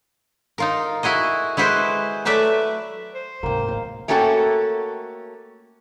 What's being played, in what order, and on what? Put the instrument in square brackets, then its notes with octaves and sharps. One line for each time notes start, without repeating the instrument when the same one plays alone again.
[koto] D#4 F4 A#4
E4 F#4 G#4 D#5
G#3 E4 F#4 B4 C5
F#3 A3 B4 D5 E5
[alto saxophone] C5
[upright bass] G#2 C3 [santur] A#3 G5
[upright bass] A1 [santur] D#5 F5
[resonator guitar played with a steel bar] A3 A#3 C#4 F#4 A4 G5